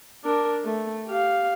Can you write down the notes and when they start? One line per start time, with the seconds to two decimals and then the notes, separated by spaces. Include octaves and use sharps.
0.25 D4 A#4
0.64 A3
1.07 G4 F5